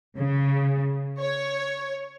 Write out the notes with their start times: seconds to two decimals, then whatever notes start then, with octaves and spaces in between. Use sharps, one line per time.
0.17 C#3
1.19 C#5